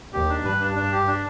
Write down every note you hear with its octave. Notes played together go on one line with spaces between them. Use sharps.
D#2 D#3 G4
D4
G2 G3 B4
D4
D4
G4
D4